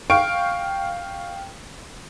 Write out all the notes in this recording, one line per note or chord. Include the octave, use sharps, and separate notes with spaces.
F5 G5 C#6 D7